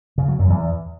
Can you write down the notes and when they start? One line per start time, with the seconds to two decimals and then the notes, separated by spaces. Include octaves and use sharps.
0.18 C#3
0.28 F#3
0.39 F#2
0.50 E2